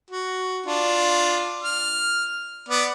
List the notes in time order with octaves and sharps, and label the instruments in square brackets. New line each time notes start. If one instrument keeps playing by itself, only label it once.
[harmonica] F#4
D4 F4
F6
B3 D5